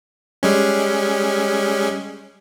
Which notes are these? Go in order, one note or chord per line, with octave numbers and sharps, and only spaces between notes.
G3 G#3 C#4